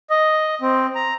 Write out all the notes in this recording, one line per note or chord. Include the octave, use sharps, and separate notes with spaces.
D#5
C4
A#5